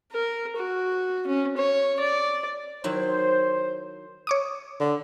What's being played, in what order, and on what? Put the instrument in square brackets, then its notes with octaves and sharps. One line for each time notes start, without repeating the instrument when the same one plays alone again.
[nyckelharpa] A#4
F#4
C#4
C#5
D5
[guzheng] D#3 F#3 E4 [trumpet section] C5
[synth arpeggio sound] C#5 D6 D#6
[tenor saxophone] D3